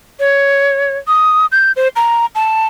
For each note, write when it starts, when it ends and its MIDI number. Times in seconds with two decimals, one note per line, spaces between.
0.20 0.98 73
1.08 1.46 87
1.52 1.72 91
1.76 1.88 72
1.96 2.26 82
2.35 2.67 81